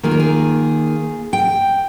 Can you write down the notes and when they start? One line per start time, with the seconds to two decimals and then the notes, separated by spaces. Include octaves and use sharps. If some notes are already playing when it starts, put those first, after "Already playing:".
0.03 D#3 A#3 F4 G#4
0.11 A#4
0.20 G#4
1.33 G5